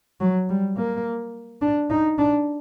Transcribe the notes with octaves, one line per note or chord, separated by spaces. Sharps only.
F#3
G3
A#3
D4
D#4
D4